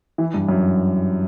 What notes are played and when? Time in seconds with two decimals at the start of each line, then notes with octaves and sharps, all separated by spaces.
0.18 E3
0.34 G2
0.49 F#2